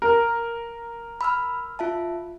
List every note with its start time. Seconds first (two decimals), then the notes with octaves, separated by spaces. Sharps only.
0.02 A#4
1.21 B5 E6 F6
1.79 F4 E5 A5